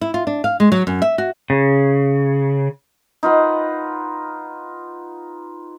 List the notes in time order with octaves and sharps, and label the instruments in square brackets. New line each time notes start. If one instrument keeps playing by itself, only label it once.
[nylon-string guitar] E4
F4
D4
F5
G#3
F#3
F#2
E5
F#4
[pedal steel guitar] C#3
[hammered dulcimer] D#4 F4 B4 F#5